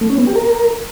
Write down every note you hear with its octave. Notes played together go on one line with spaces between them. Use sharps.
A3
C#4
B3
G4
A#4